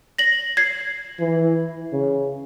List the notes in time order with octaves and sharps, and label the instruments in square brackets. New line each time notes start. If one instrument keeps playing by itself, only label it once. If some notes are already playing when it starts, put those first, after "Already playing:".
[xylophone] A#6 F#7
G#6 C7
[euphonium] E3
C#3